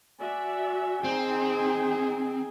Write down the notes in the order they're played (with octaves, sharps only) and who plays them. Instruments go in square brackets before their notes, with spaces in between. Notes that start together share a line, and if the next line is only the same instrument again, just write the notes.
[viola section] F#4 D5 E5 [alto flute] G#5
[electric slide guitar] C4 [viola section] D#4 G5 [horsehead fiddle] G#4